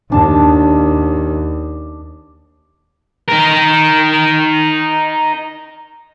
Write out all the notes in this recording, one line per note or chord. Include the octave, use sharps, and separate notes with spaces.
D#2 D4 A5
D#4 A#4